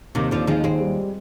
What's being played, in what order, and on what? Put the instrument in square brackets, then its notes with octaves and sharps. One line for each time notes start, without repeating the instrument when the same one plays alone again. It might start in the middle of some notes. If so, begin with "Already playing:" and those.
[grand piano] D#2 [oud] C3 D#3
[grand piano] D#2 [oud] D3 F3
[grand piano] D#3 [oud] F3 G#3
[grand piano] D#2 [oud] G#3 C4
[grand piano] G3